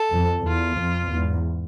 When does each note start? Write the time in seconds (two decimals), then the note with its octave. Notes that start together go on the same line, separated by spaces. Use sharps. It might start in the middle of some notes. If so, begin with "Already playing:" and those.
Already playing: A4
0.15 F2
0.47 E2 F4
0.80 F2
1.13 E2 G#2